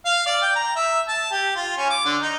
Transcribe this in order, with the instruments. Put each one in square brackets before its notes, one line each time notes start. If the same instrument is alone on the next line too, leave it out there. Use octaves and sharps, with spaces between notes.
[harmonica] F5
D5
G5
A#5
E5
A5
G4
F4
C#4
D6
D3
D#4